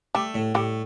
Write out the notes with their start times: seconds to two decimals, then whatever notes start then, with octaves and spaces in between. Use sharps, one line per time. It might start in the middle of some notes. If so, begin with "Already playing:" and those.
0.15 G3 A3 G4
0.35 A2
0.55 A2 G3 G4